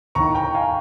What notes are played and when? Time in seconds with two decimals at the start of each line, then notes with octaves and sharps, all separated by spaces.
0.15 D#2 D#3 A#5 C#6
0.35 G5 A#5
0.55 F5 G#5